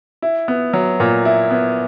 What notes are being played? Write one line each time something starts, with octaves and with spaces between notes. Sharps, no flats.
E4
B3
F#3
A#2
E4
B3